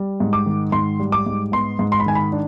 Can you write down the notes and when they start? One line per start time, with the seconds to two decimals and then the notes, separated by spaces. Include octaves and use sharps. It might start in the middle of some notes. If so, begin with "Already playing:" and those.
Already playing: G3
0.20 G#2
0.33 D6
0.46 D#3
0.72 G#2 C6
1.00 G3
1.12 D6
1.26 G#2
1.52 B3 C6
1.79 G#2
1.92 C6
2.00 B5
2.06 D#3 G#5
2.15 B5
2.32 D4